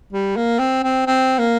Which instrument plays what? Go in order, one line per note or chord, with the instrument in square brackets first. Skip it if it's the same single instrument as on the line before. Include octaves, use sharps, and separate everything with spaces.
[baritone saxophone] G3
A#3
C4
C4
C4
A#3